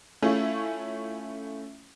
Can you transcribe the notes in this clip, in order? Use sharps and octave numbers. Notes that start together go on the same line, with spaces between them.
A3 C#4 E4 F4